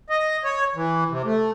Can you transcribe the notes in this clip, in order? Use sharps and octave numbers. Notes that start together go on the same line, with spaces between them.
D#5
C#5
E3
C3
A3